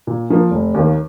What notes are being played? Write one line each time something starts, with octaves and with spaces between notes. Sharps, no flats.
A#2
F3 A#3
F1
D#2 D#3 A#3